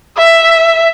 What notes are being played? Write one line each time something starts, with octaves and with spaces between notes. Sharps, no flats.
E5